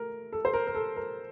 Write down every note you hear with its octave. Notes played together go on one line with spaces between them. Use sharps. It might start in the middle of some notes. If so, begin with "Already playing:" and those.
Already playing: A3 A#4
A4
C5
A#4
A#4
A4
A#4